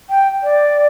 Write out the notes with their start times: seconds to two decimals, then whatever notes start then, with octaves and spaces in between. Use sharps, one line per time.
0.10 G5
0.43 D5